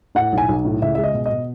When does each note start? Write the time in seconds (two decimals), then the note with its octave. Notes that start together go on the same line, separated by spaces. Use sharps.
0.15 A2 F#5
0.32 B1
0.38 G#5
0.48 B1
0.65 A2
0.82 C#2 E5
0.95 G#3 E5
1.04 D#5
1.14 B2
1.26 D#5
1.32 B2